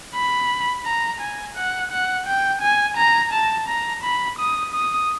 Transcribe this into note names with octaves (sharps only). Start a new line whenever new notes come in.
B5
A#5
G#5
F#5
F#5
G5
G#5
A#5
A5
A#5
B5
D#6
D#6